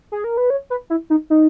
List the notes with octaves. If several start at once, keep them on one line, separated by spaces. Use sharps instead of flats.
G#4
A#4
B4
C#5
B4
E4
D#4
D#4